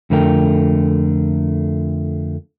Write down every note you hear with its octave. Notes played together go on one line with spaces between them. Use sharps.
F2 D3 A3 A#4 G5